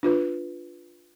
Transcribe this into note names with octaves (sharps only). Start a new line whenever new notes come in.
D4 F4 B4